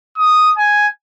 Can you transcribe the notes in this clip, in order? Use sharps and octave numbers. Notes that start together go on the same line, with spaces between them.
D#6
G#5